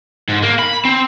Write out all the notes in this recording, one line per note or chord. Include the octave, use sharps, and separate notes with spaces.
G#2
A#3
B5
C4